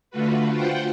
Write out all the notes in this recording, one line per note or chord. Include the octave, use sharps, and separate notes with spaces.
D3 A3 F4 F#4 B4
F4 C5 F#5 G5